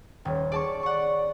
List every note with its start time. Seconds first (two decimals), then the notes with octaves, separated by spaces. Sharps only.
0.25 D#1 C#5 G5
0.52 G#4 C#5 D5 A5 C#6
0.83 D5 F#5 C#6